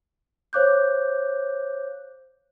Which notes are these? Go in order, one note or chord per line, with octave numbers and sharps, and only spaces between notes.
C5 C#5 F5 D6 F#6 G6